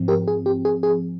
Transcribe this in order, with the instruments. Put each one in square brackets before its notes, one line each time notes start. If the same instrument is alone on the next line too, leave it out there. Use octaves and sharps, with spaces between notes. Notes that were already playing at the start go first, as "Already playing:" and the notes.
Already playing: [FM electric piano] G#2 F3 C4
G4 A#4
G#4
G4
G#4
G#4